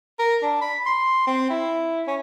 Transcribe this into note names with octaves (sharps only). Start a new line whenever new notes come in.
A#4
D4
B5
C6
C4
E4
C#4